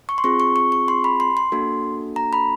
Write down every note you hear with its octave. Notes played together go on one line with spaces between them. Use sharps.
C#6
C6
C4 F4 G#4 C#6
C#6
C#6
C#6
C6
B5
C6
C6
A#3 D4 F#4 A4
A#5
B5